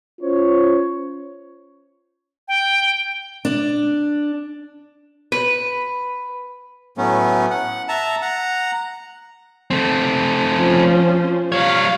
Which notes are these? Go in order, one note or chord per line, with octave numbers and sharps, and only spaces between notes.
C#4 F4 C5 C#5
G5
D4
B4
A2 F#3 A3 B3 C#4
F#5
E5 A5 A#5
F#5 A#5
A3 C4
F3 C#4 C5
G3 C#5 F5